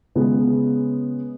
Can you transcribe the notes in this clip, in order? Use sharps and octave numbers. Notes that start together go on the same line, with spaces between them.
C#3 G#3 B3